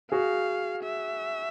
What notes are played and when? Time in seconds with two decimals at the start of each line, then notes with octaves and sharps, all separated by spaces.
0.12 F#4 G#4 F5
0.83 E5